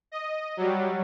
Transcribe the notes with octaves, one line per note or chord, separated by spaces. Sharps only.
D#5
F#3 G3